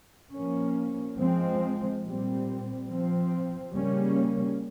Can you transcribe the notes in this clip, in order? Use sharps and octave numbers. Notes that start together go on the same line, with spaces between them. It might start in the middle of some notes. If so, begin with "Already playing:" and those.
F3 A#3 C#4
F3 G#3 C4
A#2 G3 C4
F3 C4
C#3 G3 A#3 C#4